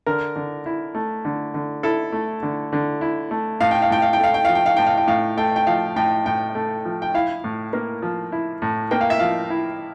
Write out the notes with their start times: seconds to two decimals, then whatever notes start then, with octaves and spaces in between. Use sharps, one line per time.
0.06 D3 A#4
0.36 D3
0.66 E4
0.95 A3
1.25 D3
1.54 D3
1.83 E4 A4
2.12 A3
2.43 D3
2.73 D3
3.01 E4
3.31 A3
3.60 A2 F5
3.71 G5
3.82 F5
3.90 A2 G5
4.02 F5
4.13 G5
4.19 A3 F5
4.34 G5
4.45 F3 F5
4.55 G5
4.66 F5
4.77 A2 G5
4.87 F5
4.97 G5
5.07 A2 F5
5.37 A3 G5
5.56 G5
5.67 F3 F5
5.96 A2 G5
6.26 A2 G5
6.55 A3
6.85 F3
7.02 G5
7.14 E4 F5
7.44 A2
7.73 A#3
8.02 F3
8.32 E4
8.62 A2
8.91 A#3 G5
9.01 F5
9.10 E5
9.19 F3 F5
9.50 E4